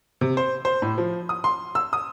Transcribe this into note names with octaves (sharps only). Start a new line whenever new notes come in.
C3
C5
C5
A2
F3
D#6
C6
E6
D#6